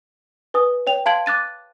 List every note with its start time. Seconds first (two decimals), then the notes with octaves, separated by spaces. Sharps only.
0.54 B4 G#5 D#6
0.87 C#5 G5 F7
1.06 F5 A5 C6 G#6 D7 F#7
1.26 D6 F#6 A6 D#7